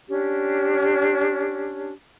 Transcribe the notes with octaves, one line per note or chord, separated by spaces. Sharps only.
C#4 D4 G4